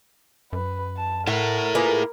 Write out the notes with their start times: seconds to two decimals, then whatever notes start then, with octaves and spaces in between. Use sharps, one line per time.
0.53 F#2 B4
0.97 A5
1.27 A2 E4 A4 A#4 E5 F#5
1.75 A#3 F4 G#4 B4